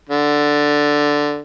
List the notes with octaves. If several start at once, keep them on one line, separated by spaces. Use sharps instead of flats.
D3